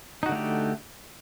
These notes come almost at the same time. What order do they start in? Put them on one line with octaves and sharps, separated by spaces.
D#4 F#4 D3 A3 G4